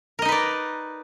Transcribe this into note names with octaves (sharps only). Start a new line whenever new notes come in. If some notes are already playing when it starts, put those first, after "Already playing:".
D#4 A#4 B4 D5 D#5